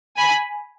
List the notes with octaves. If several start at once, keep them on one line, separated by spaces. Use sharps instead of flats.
G#5 B5